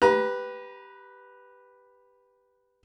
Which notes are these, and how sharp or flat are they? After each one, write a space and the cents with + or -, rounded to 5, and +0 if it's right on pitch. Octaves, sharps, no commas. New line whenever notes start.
G4 +0 B4 +0 A#5 +30